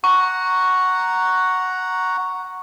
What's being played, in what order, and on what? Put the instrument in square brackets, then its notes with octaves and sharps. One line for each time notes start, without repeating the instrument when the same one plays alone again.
[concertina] F#5 A#5 [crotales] C#6